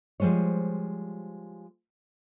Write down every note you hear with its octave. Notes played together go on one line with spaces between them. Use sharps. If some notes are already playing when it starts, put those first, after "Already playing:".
F3 G3 G#3 C5 C#5